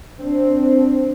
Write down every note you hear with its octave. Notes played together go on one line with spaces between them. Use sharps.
C4 D4